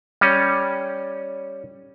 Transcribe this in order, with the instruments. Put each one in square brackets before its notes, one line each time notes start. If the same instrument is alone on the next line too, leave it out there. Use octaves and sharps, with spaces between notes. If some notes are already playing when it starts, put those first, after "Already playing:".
[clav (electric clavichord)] G3 C#4